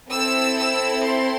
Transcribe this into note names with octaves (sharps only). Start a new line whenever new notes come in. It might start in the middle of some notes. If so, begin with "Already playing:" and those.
C4 E4 A4 E6
E6
C6